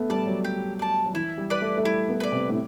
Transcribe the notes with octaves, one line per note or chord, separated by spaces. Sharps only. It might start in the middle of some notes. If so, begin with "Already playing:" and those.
Already playing: A3 B3
G3 D5 A5
F#3
G4
D5 A5
F#3
E3 E4
G3
B4 D5
A3
A3
G3 E4
B3
B4 D5
C3
A2